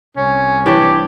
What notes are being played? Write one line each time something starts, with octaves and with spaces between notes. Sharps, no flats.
C2 C#4
E3 D4 G4 C#5